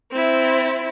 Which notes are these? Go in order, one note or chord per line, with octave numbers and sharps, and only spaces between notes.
C4 E4